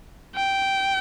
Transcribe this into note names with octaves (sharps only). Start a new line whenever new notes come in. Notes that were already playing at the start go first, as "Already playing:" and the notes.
G5